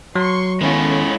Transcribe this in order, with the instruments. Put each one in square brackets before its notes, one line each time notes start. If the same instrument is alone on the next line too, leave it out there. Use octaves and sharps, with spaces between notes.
[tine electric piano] F#3 [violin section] C6 C#6
[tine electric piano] D#3 B3 [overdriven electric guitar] G#3 E4 [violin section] C#4 F4 A4